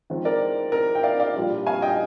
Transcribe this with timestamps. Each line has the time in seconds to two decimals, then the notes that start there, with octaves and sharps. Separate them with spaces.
0.10 D#3 G#3 C4 F4
0.25 A#4 D5
0.72 A#4
0.95 G5
1.03 D5 F5
1.20 D5 F5
1.35 A#2 G3 D4 F4
1.66 F5 G#5
1.82 D#5 G5